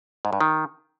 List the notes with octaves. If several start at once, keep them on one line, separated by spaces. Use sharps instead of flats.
G#2
G2
D#3